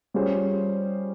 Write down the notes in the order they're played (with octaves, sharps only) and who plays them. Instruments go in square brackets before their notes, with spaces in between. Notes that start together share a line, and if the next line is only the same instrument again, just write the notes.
[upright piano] G3 C#4 F4 G#4 C5